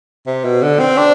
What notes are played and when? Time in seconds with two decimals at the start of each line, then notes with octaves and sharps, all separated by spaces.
0.27 C3
0.45 B2
0.63 D3
0.80 C4
0.98 D4